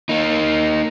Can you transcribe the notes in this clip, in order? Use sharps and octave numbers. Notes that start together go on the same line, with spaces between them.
A#3 D#4